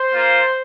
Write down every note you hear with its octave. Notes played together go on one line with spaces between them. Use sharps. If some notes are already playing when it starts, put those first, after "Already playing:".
Already playing: C5
A#3 F4